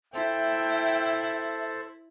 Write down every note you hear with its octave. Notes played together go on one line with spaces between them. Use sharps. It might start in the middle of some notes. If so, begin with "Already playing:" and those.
E4 A4 C5 E5 G5 A5